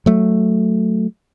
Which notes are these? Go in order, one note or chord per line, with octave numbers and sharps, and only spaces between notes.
F#3 A3